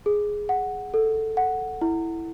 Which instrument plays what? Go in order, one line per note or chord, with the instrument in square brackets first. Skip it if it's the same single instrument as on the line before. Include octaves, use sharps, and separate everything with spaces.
[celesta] G#4
F#5
A4
F#5
E4